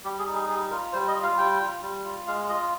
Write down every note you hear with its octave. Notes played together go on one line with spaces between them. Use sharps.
G3 G4
G#4
D#4
G#4
G3 G#4
F4 A#4
G3 C5
D#5
F4
F5
G3 G5
F4
G3
F4
G#3 F5
F4 D#5